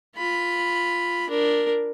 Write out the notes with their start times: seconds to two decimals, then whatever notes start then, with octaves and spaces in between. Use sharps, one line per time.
0.16 F4 B5
1.29 D4 A#4